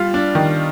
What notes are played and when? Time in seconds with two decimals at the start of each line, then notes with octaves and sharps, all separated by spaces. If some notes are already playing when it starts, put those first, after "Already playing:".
Already playing: G3 F4
0.14 D4
0.35 D#3